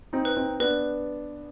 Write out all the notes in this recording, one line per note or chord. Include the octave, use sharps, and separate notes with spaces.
C4 D#4
B4
C4 D#4
B3 D4 B4